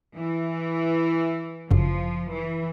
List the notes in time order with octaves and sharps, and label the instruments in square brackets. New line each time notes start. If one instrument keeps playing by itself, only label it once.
[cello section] E3
[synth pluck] G1 F#2 C#3 [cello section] F3
[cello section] E3